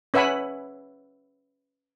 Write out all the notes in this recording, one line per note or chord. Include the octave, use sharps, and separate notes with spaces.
C#4 B4 E5 F#5 G#5 B5